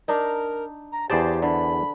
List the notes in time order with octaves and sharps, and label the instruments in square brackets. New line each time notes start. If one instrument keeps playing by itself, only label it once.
[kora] D4 D#4 [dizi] A#4
[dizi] A#5
[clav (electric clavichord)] E2 D5 A5 [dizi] G4 [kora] G#4 B4 C5
[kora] D3 [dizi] B5